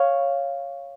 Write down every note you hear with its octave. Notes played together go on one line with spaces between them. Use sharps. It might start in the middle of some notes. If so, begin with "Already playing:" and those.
Already playing: C#5 F5